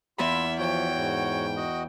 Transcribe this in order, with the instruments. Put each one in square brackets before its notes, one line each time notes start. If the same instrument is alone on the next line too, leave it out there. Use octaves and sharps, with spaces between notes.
[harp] E2 B5 [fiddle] E4 E5 [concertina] F4
[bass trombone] F3 [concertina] F#4 C#5 [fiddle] G5
[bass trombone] G#2
[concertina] F#4 D#5